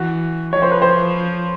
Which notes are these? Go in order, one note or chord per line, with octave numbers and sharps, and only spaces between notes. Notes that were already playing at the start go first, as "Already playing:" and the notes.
Already playing: E3 F#4
F3 C#5
C5
B4
C5